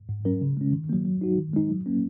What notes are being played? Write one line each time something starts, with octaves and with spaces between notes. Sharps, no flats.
G#2
F#3 C#4 A#4
C#3
G#3 C#4
D#3
F#3 A#3
F#3
D#4 F#4
D#3
G#3 D#4
F#3
A#3 C#4